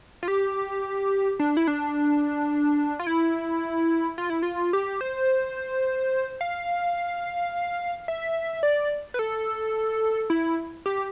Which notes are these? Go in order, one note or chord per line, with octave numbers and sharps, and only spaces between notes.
F4
G4
D4
E4
D4
F4
E4
F4
E4
F4
G4
C5
F5
E5
D5
B4
A4
E4
G4